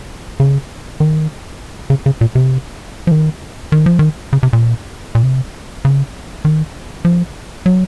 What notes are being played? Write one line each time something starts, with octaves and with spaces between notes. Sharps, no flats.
C#3
D#3
C#3
C#3
A#2
C3
F3
D#3
D#3
F3
D#3
C#3
C3
A#2
A#2
C3
C#3
D#3
F3
F#3